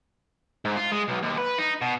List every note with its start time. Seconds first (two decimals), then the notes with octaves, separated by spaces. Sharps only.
0.65 G#2
0.77 F4
0.92 G#3
1.09 B1
1.23 D#2
1.38 B4
1.59 D#4
1.82 B2